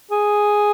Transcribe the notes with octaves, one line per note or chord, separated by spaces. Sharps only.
G#4